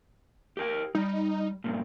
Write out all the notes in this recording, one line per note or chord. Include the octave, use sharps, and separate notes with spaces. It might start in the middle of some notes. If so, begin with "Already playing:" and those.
G4 A#4 G5
G3 D#4
G2 A#2